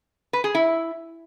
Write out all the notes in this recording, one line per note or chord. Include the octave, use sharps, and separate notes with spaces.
B4
G#4
E4